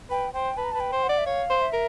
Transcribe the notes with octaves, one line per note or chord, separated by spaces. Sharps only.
B4 G5
C5 G5
B4 A5
A#5
B4 A5
G5
C5
F#5
D5
E5
C#5 F5
C5
E5
A#4